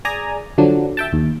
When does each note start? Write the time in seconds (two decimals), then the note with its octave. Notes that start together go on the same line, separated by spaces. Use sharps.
0.05 G#4 D5 G#5 A#5
0.58 D3 F3 F#3 D4
0.97 E5 G5 A5
1.13 D#2